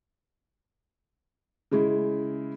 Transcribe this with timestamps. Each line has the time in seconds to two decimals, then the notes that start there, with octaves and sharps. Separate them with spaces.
1.71 C#3 G#3 E4